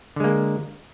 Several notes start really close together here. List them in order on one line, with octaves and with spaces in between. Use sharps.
D3 G#3 A#3